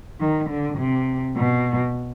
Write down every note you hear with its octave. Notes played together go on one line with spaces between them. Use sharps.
D#3
D3
C3
B2